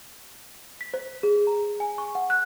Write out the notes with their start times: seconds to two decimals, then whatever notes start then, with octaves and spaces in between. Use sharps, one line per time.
0.81 B6
0.94 C5
1.23 G#4
1.47 A#5
1.80 G#5
1.98 C#6
2.15 F#5
2.30 F#6